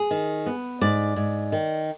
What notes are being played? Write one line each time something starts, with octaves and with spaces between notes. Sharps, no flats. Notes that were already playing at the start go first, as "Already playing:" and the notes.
Already playing: G#4
D#3
B3
G#2 D5
G#2
D#3